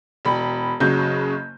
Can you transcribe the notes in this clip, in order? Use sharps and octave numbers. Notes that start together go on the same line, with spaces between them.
E1 B5
F#1 C#3 F#3 G6